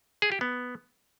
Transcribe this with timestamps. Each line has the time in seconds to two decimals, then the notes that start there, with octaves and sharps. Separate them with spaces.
0.22 G#4
0.32 G4
0.41 B3